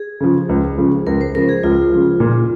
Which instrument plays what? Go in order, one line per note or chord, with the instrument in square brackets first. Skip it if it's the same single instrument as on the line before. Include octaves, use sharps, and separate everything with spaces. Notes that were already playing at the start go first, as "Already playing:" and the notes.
Already playing: [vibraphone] G#4
[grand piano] C#3 F3
C#2
C#3 F3
[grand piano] C#2 [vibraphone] A#4
[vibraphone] C5
[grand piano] C#3 F3 [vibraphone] A#4
[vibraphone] G#4
[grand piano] C#2 [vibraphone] F4
[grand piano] C#3 F3
A#2